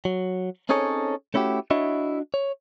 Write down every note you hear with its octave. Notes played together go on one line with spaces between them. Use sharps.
F#3
C4 C#4 D#4 G#4 A4 C#5
A3 C#4 E4 F#4 G4
D4 E4 F#4 C#5 D#5 E5
C#5